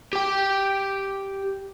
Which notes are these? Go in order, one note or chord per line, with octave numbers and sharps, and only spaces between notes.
G4 G5